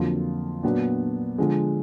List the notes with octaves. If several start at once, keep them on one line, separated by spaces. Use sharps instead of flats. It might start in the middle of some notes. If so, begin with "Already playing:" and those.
Already playing: F2 D3 F#3 A#3 F4
A#2 F#3 B3 D4
D3 F3 G#3